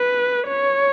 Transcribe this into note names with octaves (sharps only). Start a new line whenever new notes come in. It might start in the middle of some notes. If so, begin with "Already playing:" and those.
Already playing: B4
C#5